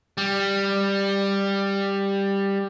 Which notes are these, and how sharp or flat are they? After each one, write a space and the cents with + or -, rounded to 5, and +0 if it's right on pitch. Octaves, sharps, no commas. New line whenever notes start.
G3 +10